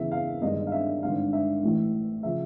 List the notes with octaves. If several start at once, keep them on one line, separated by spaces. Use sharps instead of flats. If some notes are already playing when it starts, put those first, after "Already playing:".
Already playing: E2 C#3 E3 E5
F5
G1 G2 D#3 G#3 D#5
F5
E5
G#1 G2 D3 F5
E5
A1 A2 E3 A3
C#3 F3 E5